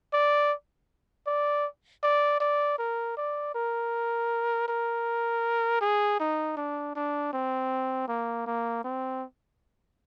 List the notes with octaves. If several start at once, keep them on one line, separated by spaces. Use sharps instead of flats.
D5
D5
D5
D5
A#4
D5
A#4
A#4
G#4
D#4
D4
D4
C4
A#3
A#3
C4